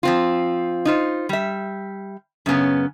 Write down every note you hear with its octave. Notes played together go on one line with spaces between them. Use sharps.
F3 C4 F4
D#4 F4 C5
G3 E5
F#2 C#3 B3 C#4